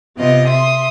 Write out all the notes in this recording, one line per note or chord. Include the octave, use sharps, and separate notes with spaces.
C3 B3 F4 D#5
E5 C6 D#6